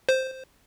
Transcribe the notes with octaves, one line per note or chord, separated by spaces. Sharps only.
C5